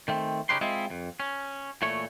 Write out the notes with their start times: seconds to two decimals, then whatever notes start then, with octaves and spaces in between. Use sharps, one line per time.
0.08 D#3 A3 C4
0.49 C#3 C#4 D#4 G4 B4 C6
0.61 G#3 C4 E4 F4 D#5 E5
0.90 F2
1.20 C#4
1.82 A#2 E3 A3 C#5